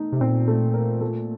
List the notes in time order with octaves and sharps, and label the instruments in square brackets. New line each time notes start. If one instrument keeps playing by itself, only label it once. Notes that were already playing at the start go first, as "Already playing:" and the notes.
Already playing: [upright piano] A3 D#4
[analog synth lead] C3
[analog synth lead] A#2 [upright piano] C4
[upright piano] A3
A#4
A3